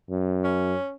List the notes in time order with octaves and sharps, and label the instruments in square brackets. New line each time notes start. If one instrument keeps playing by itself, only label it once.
[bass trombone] F#2
[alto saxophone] C#4